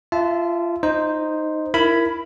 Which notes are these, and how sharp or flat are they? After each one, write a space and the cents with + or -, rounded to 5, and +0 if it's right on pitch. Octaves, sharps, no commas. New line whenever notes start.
F4 -25 E5 +0 A5 -15
D#4 +0 C5 +0 D#5 +0
E4 +20 A#4 +0 B5 +0